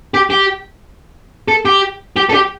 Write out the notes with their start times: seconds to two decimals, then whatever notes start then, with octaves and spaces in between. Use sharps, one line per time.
0.14 G4
0.30 G4
1.48 A4
1.65 G4
2.16 G4
2.29 A4
2.34 G4